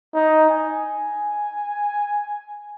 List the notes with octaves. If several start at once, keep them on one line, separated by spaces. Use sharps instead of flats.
D#4
G#5